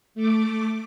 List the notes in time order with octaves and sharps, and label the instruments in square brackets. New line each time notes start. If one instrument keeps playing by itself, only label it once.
[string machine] A3 D6